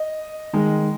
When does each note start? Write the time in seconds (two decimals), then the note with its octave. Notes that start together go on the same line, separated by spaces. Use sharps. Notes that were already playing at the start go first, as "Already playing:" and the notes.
Already playing: D#5
0.53 D#3 G#3